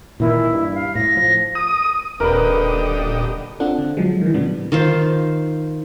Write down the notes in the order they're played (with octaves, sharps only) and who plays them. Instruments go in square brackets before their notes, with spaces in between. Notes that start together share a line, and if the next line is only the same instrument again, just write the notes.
[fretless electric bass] A#2 D#3 E3 [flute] E4
[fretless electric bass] G2
[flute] F5
[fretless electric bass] A2 [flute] A#6
[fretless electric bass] F3
[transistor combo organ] D#6
[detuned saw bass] D#1 [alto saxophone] D3 [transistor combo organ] G4 D#5 [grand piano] A#4 B4
[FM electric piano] C4 D4 F4 A4 F#5
D3
F3 F#3 G#3
D#3 E3
A2 C#3 F3 G3 B3 D4
[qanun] D#3 F4 C5